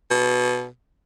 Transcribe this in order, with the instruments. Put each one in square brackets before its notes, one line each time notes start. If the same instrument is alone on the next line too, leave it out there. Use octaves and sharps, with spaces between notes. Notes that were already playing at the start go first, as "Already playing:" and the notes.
[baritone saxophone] B2